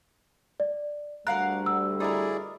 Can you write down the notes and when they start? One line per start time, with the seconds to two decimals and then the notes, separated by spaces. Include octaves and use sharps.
0.60 D5
1.27 D2 G3 A#4 F5 F#5 F#6
1.66 E6
2.00 D#4 E4 G#4 A#4 D5